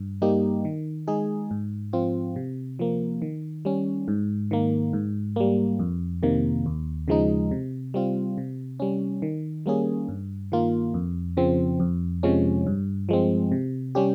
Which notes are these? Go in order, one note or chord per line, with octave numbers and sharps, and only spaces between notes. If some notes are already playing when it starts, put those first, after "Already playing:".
Already playing: G2
G3 A#3 D#4 G4
D#3
G#3 D#4 G#4
G#2
F3 C4 F4
C3
F3 A#3
D#3
G3 C#4
G#2
D#3 A#3
G#2
G3 A#3
F2
C3 D#3 A#3
D#2
C#3 F3 G#3 D#4
C3
G3 C4 F4
C3
G3 C#4
D#3
G3 A#3 C#4 G#4
G2
D#3 A#3 F4
F2
C#3 F3 C4
F2
C3 F3 G#3 C#4
G2
F3 G#3 C4
C3
G3 C#4 G4